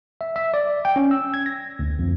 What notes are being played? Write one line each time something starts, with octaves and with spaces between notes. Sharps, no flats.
E5
E5
D5
G5
C#4
E6
G#6
A#6
D2
F2